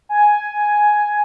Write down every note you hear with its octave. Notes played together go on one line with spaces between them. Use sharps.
G#5